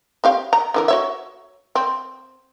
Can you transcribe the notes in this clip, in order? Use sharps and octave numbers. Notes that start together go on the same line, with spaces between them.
C4 G4 F5
A#5
D3 E3 A#4
F#4 C#5 E5
C4